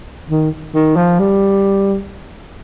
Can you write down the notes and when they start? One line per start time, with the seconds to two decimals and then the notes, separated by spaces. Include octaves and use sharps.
0.30 D#3
0.74 D#3
0.96 F3
1.19 G3